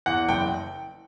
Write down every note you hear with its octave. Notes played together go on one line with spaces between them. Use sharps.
E2 F#5
F#1 G5